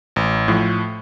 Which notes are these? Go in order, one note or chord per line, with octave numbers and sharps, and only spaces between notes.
A1
A2 F3